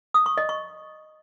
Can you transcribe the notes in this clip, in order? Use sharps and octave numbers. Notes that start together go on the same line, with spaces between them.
D#6
C#6
D#5
C#6